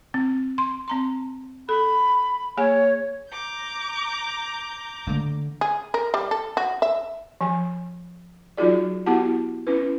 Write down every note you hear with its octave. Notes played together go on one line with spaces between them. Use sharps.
C4
C6
C4 A#5 C6
A4 B5
A#3 G#4 C#5 G#5
A#5 D6 G6
D3 A3
G#4
A#4
G3
A4
F#4
E5
F3 G#5
F#3 D#4 F4 F#4 G#4 D5
B3 E4 F#4 G4 F#5 A5
C#4 E4 B4